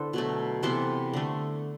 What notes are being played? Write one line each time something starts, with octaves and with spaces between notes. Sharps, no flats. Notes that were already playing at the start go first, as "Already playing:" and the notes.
Already playing: D3 B3 D4 E4 A4 C5
B2 F#3 A3
C3 E3 B3 A4 C5
D3 A3